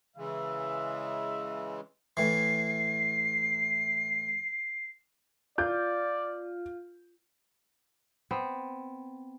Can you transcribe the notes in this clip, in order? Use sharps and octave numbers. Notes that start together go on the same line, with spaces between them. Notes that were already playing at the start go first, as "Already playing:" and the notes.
C#3 E3 G#3 E5
A2 E3 C7
F4 D5 G6
B3 C4